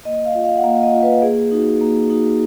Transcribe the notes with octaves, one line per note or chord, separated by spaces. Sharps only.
A#3 D#5
F5
F4
F5
F#5
A#3 F5
D#5
F4
B4
A#3 G#4
D#4 F#4
A#3
D#4 F#4